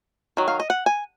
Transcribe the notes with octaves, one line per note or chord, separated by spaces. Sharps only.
D#3 F#3
F5
D#5
F#5
G#5